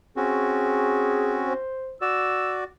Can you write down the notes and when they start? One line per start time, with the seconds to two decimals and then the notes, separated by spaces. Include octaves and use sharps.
0.17 C4 C#4 F#4 G#4
1.48 C5
2.01 F#4 D5 E6